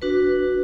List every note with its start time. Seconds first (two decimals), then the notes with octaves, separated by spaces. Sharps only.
0.02 D4 F#4 B4